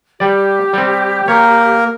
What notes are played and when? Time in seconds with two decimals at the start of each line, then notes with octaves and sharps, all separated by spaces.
0.20 G3 G4 D5
0.73 G3 C4
1.28 A#3 A#4 C#5